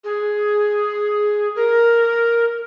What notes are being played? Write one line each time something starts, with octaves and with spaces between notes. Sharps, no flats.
G#4
A#4